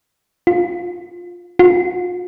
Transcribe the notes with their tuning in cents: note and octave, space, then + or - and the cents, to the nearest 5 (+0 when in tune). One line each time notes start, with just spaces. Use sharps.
F4 +10
F4 +45